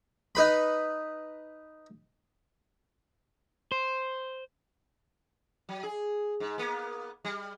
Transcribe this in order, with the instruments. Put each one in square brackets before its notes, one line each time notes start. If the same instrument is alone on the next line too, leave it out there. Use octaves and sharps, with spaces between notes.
[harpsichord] D#4 B4 B5
[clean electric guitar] C5
[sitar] F#3
G#4
G#2
A#3 B3
G3